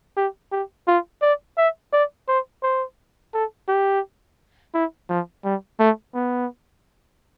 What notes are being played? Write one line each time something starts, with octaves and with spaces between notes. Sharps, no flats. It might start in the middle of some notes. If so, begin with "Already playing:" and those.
G4
G4
F4
D5
E5
D5
C5
C5
A4
G4
E4
F3
G3
A3
B3